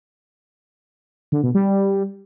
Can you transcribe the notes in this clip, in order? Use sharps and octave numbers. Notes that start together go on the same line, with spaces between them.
D3
B2
G3